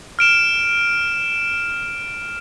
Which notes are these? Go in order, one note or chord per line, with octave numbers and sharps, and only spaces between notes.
F6 D7 E7